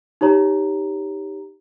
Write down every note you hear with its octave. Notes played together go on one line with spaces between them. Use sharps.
D#4 G4 C#5 A#5